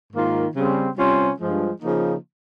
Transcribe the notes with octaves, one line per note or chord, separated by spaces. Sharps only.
G#2 D#3 A#3 F4
C#3 G3 C4
C3 G3 C#4 F4 C5
G2 F3 G#3
C#3 F3 A#3 D#4